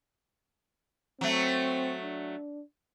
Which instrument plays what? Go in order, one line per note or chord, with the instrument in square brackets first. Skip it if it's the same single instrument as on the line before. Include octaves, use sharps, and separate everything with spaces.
[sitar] F#3 A3 [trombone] C4
[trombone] D4